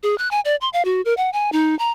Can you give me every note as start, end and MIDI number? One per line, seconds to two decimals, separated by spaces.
0.03 0.17 68
0.18 0.30 90
0.31 0.40 80
0.45 0.56 74
0.61 0.69 84
0.73 0.83 77
0.85 1.02 66
1.05 1.14 70
1.17 1.30 78
1.33 1.50 80
1.52 1.77 63
1.79 1.91 82